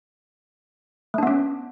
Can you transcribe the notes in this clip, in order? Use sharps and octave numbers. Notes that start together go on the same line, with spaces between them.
A3 B3 C#4 D4